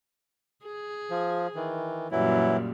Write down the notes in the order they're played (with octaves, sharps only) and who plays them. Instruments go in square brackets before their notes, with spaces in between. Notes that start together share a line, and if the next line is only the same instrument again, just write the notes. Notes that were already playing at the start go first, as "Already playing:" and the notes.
[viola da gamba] G#4
[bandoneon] F3
D#3 E3
[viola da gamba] F#2 A#2 G3 [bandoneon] E3 F#3 E4